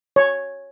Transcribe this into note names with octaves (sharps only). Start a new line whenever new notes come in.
C#5